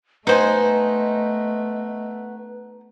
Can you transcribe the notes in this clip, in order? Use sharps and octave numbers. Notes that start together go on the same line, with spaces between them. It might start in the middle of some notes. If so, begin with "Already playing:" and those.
A3 B3 D#4 C5 D#5 G#5